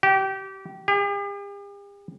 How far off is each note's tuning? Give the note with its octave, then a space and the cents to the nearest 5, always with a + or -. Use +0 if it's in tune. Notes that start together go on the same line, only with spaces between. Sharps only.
G4 -25
G4 +45